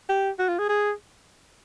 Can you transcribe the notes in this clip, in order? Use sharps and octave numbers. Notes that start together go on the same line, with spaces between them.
G4
F#4
F4
G#4
G#4